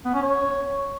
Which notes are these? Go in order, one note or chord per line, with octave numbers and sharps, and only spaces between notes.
B3
C#4
C#5